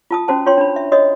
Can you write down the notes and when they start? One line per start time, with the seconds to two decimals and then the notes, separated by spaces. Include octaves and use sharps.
0.11 F4 A5 D#6
0.28 C#4 F#4 C5 A5
0.46 F4 C#5 G5 C6
0.58 D4 B5
0.76 E5
0.92 F#4 C#5 D#5 D#6